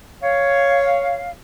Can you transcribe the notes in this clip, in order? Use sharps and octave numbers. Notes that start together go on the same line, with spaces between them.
C#5 F5